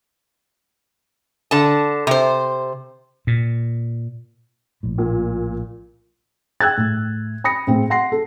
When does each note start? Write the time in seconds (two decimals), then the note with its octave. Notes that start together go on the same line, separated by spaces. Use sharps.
1.51 D3 A5
2.07 C3 C5
3.27 A#2
4.83 A#1 A2
4.98 A#2
6.61 G5 E6 F#6 G#6 A6
6.77 A2
7.44 B5 D#6 A#6 C#7
7.67 A2 C4 G#4
7.90 F#5 C6 A#6 C7
8.12 A4